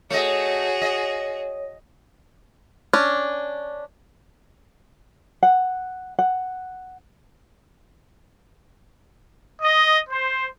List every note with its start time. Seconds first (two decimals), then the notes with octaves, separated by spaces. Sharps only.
0.10 A3 F#4 G#4 C#5 D#5
0.82 D#5
2.93 C#4 D4
5.43 F#5
6.19 F#5
9.61 D#5
10.08 C5